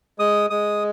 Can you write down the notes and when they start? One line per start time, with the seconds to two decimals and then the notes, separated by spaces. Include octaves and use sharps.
0.19 G#3 D#6
0.50 G#3 D#6